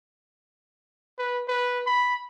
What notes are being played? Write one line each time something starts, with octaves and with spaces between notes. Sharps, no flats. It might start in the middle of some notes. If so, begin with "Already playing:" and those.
B4
B4
B5